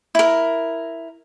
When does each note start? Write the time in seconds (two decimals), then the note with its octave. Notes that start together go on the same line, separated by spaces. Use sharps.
0.15 E4 A#4